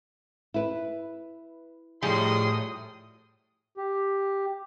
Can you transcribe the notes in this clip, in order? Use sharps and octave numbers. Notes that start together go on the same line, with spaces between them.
E4 B4
A2 F3 G3 D#4 F#4 G#4 C6 D#6
G4